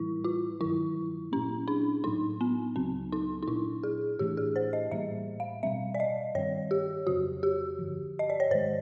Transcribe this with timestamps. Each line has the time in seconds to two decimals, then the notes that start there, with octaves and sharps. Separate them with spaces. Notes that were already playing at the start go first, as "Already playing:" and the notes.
Already playing: A2 E3 G3 E4
0.24 F4
0.60 G2 D#3 F#3 E4
1.32 A#2 F#3 A#3 C#4
1.68 D4
2.04 A2 F#3 A#3 D#4
2.41 B3
2.76 C#2 C#3 F#3 C4
3.12 D#4
3.43 D#4
3.48 A#2 F#3 B3 D4 E4
3.83 G#4
4.19 A2 E3 A3 D4 G4
4.37 G#4
4.56 C5
4.73 D#5
4.91 A2 E3 G3 A#3 E5
5.40 F5
5.63 B2 G3 C4 E5
5.94 D5
6.00 D#5
6.35 G2 D#3 G3 C4 C#5
6.71 G4
7.07 F2 C#3 F#3 F#4
7.43 G4
7.79 G2 D3 F3
8.19 D#5
8.30 D5
8.40 C#5
8.51 G#2 D#3 G#3 C5